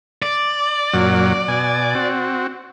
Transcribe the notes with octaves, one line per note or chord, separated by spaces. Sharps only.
D5
F#2 A#2 F#3
B2 G#5
C4 F#4